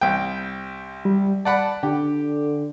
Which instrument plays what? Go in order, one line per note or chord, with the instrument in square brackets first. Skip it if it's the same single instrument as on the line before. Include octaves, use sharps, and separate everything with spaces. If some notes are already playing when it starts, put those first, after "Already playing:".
[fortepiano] C2 G5
[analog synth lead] G3
[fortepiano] D5 F#5 B5 [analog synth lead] A5
[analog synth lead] D3 [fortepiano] G4